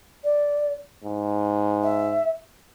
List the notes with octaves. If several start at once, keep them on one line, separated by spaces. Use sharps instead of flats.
D5
G#2
E5